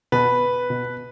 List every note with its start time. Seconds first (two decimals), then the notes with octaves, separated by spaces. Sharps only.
0.12 B2 B4
0.70 B2